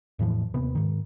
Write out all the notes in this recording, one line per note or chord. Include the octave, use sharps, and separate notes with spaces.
E2 A2 E3 F3
D#2 C3 B3
G#2 D#3